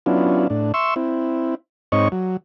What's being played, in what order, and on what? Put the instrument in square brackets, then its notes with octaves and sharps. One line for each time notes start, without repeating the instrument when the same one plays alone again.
[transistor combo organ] F#3 B3 C#4 D4 E4 F4
A2 D4
E5 C6 C#6 E6
C4 E4
G#2 C4 D#4 C#5 D#5 C#6
F#3